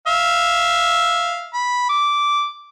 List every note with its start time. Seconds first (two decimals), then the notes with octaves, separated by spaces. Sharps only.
0.07 E5 F5
1.53 B5
1.89 D6